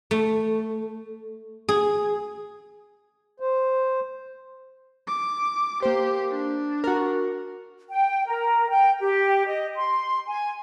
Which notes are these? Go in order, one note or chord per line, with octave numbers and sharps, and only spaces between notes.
A3
G#4
C5
D6
A#3 G4 C5
D4
F#4 A#4
G5
A#4
G5
G4
D#5
C6
G#5